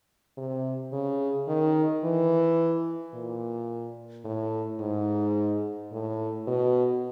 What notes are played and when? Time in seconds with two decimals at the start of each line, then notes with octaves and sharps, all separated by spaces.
0.38 C3
0.92 C#3
1.48 D#3
2.04 E3
3.14 A#2
4.25 A2
4.80 G#2
5.92 A2
6.47 B2